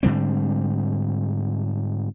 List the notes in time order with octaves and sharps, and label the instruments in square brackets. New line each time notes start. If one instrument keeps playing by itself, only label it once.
[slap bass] G#2 D3 G3 C4